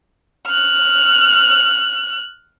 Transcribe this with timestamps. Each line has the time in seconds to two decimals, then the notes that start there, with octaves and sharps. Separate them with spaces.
0.46 F6 F#6